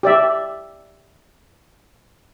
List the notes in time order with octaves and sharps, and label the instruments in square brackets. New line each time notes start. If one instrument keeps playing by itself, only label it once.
[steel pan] G4 D5 E5